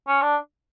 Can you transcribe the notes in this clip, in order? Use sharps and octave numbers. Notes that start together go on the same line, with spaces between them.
C#4
D4